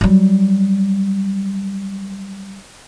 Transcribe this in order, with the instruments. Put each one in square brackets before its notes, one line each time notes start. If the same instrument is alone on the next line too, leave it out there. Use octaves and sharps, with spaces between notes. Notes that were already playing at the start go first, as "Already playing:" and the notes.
[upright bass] F#3 G3